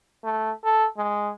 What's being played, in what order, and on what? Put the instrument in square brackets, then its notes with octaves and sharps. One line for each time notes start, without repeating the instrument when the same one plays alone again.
[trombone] A3
A4
G#3